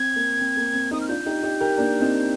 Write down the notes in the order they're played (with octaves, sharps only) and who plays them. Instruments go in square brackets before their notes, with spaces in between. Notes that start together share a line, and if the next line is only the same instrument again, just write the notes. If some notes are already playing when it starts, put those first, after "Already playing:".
Already playing: [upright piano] C4 [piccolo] G#6
[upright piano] A#3
C4
A#3
C4
[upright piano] C4 D#4 [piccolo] D#6
[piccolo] F6
[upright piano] D4 F4 [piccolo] G6
[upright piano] D#4 G4
D#4 G4
G4 A#4
A#3 D4
C4 D#4